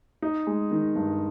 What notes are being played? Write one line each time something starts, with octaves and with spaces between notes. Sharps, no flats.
D#4
G#3
D#3
G2